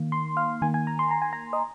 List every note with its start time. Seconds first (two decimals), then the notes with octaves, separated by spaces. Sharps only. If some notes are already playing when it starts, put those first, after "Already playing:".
Already playing: D#3 A#3
0.12 C6
0.37 F5
0.62 D#3 A#3 G#5
0.74 G#5
0.87 A#5
0.99 C6
1.11 A#5
1.22 G#5
1.33 A#5
1.53 D#5